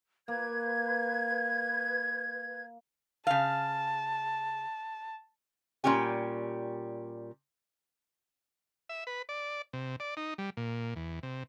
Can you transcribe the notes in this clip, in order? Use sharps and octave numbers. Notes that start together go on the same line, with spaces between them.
A#3 B4 G#6
C#3 F5 A5
A#2 G3 C#4 G4 G#5
E5
B4
D5
C3
D5
D#4
G3
A#2
E2
C3